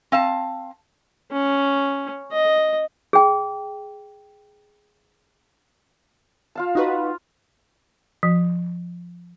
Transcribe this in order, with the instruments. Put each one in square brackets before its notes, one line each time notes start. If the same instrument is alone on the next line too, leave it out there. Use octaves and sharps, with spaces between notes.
[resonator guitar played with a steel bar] C4 F5 A5
[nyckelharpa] C#4
D#5
[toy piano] G#4 G5
[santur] F4 F5 A5
[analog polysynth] D#4 F#4 B4
[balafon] F3